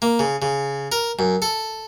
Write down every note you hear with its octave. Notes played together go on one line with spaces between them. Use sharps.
A#3
C#3
C#3
A#4
F#2
A4